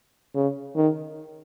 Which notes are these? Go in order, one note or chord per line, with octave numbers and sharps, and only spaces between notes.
C#3
D#3